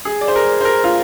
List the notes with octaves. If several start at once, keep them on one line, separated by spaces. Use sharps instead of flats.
G#4
D5
C5
A#4
C5
A#4
F4